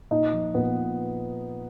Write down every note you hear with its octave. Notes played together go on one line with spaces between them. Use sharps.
A#2 D#4 D#5
F3
A#2 B3 B4